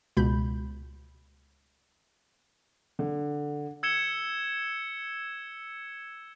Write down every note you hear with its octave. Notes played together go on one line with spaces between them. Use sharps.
C#2 B2 B5 G6
D3
E6 G#6 C#7 E7 G7